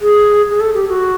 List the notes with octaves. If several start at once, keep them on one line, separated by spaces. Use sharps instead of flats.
G#4
G#4
A4
G4
F#4